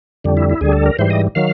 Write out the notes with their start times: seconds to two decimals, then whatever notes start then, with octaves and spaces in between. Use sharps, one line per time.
0.24 F2 D3 G3
0.37 E4
0.49 E4
0.61 D2 D3 G3 G#4
0.73 A4
0.86 A#4
0.99 G#2 E3 G3 C5
1.10 D#5
1.35 D#3 F#3 F5